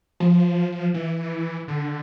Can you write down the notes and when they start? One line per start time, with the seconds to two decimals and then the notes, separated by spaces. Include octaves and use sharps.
0.20 F3
0.94 E3
1.68 D3